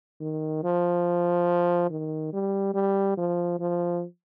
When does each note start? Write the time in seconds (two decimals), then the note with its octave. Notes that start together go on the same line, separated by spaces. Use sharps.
0.21 D#3
0.64 F3
1.91 D#3
2.33 G3
2.74 G3
3.18 F3
3.60 F3